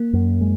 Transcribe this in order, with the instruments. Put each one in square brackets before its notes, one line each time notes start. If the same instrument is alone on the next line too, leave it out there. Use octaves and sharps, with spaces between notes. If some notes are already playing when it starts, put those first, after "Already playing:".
Already playing: [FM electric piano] A#3
[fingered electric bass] F#2
G#3